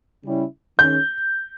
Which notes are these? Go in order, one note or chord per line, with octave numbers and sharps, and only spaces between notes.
C#3 G3 C#4 E4
D#3 G#3 C#4 G6